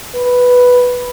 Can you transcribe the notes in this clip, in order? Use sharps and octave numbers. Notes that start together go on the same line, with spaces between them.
B4